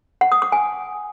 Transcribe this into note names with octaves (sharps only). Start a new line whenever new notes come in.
F#5
D#6
D6
G#5